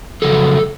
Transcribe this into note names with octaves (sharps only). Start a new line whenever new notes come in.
F2 C#3 F#3 A4